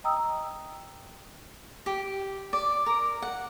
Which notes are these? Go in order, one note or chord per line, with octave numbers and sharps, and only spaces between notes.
D#5 G5 A#5 D#6 E6
G4
D5 D6
A#4
F#5